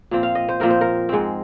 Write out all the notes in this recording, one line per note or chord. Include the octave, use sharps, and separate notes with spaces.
A#2 F3 C4
F5
D#5
C5
A#2 F3 C4 A#4
C5
A#4
G#2 G#3 C4